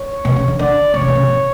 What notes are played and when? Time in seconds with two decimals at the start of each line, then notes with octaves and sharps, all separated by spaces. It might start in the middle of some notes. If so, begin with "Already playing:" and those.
Already playing: C#5
0.25 B2
0.36 C#3
0.48 D3
0.59 D3 D5
0.94 D3 C#5
1.01 C#3
1.08 B2
1.15 C#3
1.28 B2